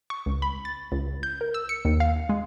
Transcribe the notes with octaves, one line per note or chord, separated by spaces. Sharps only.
C#6
C#2
B5
A6
C#2
G6
A#4
E6
C#7
D#2
F5
G#3